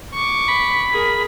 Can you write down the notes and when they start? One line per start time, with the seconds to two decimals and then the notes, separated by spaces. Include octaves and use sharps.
0.13 C#6 D6
0.48 B5
0.92 G#4 A#4